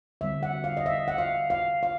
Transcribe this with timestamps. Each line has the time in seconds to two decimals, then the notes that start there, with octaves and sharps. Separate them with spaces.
0.21 D3 G3 C4 E5
0.43 F#5
0.64 F5
0.77 D#5
0.86 E5
1.08 F#5
1.18 F5
1.50 F5
1.83 F5